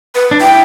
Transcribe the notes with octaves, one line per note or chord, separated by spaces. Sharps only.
B4
D4
E4 G5